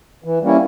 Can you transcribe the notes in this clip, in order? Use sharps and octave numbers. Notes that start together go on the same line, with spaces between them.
E3
G3 A#3 C#4 E4